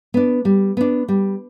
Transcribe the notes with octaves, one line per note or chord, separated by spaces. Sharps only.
B3 D4
G3
B3 D4
G3